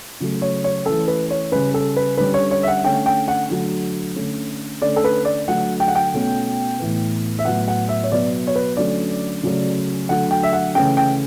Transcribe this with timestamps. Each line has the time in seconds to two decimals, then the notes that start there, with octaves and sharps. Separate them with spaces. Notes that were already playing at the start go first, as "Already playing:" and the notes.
0.20 C#3 F#3 A3
0.42 C#5
0.64 C#5
0.86 E3 A3 C#4 A4
1.08 B4
1.30 C#5
1.52 C#3 G3 C#4 B4
1.74 A4
1.96 B4
2.17 D3 G3 C#4 B4
2.34 C#5
2.51 C#5
2.63 E5
2.68 F#5
2.83 D3 A3 C#4 G5
3.06 G5
3.28 F#5
3.50 D3 F#3 A3
4.16 D3 A3 C#4
4.82 D3 A3 C#4 D5
4.96 A4
5.04 B4
5.25 D5
5.48 D3 F#3 A3 F#5
5.80 G5
5.88 F#5
5.95 G5
6.14 B2 A3 C#4
6.79 A2 E3 B3
7.39 E5
7.45 A2 F#3 B3 F#5
7.68 F#5
7.89 E5
8.03 C#5
8.12 B2 F#3 B3 D5
8.47 C#5
8.55 B4
8.77 D3 F#3 A3 C#4 D5
9.43 C#3 F#3 A3 C#4
10.09 D3 F#3 A3 F#5
10.31 G5
10.43 E5
10.53 F#5
10.75 C#3 E3 A3 C#4 G5
10.97 G5